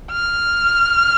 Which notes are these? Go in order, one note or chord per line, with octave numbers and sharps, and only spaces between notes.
F6